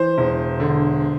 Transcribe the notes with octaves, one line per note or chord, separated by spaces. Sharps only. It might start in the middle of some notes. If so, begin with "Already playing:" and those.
Already playing: E3 C5
E1
D3